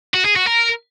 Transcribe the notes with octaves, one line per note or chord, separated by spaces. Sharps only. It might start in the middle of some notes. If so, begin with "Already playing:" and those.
F#4
G#4
F#4
A#4